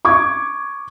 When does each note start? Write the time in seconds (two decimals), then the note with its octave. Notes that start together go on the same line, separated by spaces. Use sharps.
0.05 C#6 D6 G#6